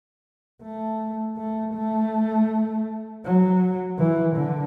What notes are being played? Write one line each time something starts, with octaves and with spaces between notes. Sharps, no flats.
A3
A3
A3
F#3
E3
D3